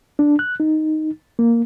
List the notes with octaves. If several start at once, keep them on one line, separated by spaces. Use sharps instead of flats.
D4
F#6
D#4
A#3